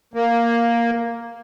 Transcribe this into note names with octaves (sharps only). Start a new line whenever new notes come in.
A#3